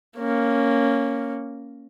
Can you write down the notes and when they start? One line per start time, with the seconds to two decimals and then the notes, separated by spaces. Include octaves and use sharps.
0.17 A#3 C#4